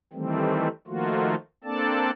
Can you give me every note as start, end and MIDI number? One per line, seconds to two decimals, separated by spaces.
0.13 0.68 51
0.13 0.68 52
0.13 0.68 55
0.13 0.68 57
0.13 0.68 60
0.87 1.35 51
0.87 1.35 53
0.87 1.35 57
0.87 1.35 58
0.87 1.35 65
0.87 1.35 66
1.64 2.11 58
1.64 2.11 60
1.64 2.11 62
1.64 2.11 69
1.64 2.11 74
1.64 2.11 81